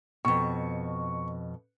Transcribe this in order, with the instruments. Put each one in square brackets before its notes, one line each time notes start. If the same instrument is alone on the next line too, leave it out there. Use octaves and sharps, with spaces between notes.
[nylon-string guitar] F2 B2 [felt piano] C#6